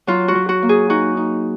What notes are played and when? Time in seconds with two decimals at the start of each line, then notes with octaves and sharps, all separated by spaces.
0.07 F#3 F4
0.28 F#4
0.35 F#3
0.49 F#4
0.62 A#3
0.69 G#4
0.90 D#4 F#4
1.17 D#4